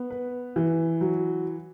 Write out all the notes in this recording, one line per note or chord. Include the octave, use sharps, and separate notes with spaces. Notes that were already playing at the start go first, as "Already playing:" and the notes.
Already playing: B3
B4
E3
F#3